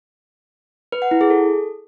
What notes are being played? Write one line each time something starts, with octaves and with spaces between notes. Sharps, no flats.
B4
F#5
E4
G#4
A4